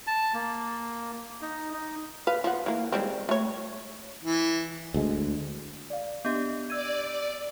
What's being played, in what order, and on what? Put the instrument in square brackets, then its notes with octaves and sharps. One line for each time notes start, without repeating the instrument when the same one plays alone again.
[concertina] A5
A#3
D#4
D#4
[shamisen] B4 F5
F3 F#5
E3 A#3
G3 G#3 C4
A3 C#5
[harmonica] E3
[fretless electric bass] D2 G#3
[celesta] D5 F5
[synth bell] B3 G4 [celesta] D4 D#5 G6
[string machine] D5 [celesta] E6 G#6 [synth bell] D#7